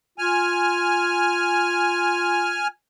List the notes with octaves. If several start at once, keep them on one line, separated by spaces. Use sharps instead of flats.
F4 G#5 F6